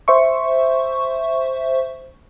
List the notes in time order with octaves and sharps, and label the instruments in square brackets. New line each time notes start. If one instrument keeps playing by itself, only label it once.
[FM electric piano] C5 E5 C#6